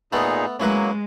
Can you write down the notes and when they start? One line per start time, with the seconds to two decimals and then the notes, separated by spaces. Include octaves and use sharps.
0.13 A#2 A3 B3 D#4 G#4 A4
0.60 F#3 G#3 A#3 C#4 E4 B4